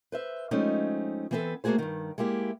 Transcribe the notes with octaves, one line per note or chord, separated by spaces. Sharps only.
B4 C5 E5
F3 G#3 A3 C4 C#4 D#4
E3 B3 C4 A4 B4
A3 A#3 C#4 F#4 G#4 C5
G2 D#3
G#3 A#3 E4 G4